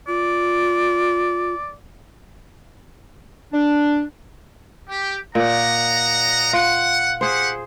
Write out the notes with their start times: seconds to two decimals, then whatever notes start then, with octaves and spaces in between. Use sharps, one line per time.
0.08 F4 D5
3.52 D4
4.89 G4
5.35 A#2 D5 D#5 F#5 A#5
6.53 F4 F#5
7.21 G4 G#4 C5 F#5